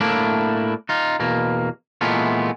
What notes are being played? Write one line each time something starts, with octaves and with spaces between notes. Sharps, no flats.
A2 A3 A#3 D4 E4
D#4 F4
E2 B2 A#3
A#2 E3 G#3 A3 B3 F4